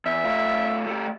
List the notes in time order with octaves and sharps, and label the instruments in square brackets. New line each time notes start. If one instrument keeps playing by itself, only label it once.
[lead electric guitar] E2 [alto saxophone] E5
[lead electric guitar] A3 F4
A3 G4